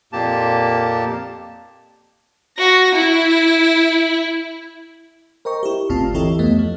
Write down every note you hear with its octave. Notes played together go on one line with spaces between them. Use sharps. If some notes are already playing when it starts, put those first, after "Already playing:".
F2 A#2 A#3 G4 A5
F#4 A#6
E4
A#4 C5 D#5 G5 A#5 C#6
E4 G4
G1 D2 A2 C4 F4 A5
E3 E4 G4 A4 C#5 D#5
F2 A3 B3 D#5
F3